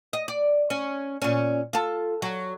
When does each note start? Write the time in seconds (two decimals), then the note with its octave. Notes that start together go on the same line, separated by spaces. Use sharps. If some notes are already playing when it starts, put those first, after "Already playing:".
0.13 D#5
0.28 D5
0.70 C#4
1.22 A#2 C#4
1.73 F4 A4
2.22 F#3